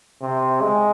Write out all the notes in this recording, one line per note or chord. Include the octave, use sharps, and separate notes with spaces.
C3
G#3